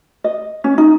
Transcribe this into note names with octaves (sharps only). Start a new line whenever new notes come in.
D#5
C#4
D#4